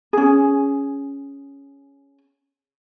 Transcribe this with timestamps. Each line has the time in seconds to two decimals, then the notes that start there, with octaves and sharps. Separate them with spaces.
0.13 C#4 G#4